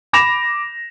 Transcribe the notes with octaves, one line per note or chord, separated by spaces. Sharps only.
B5 D6 A#6 E7 F7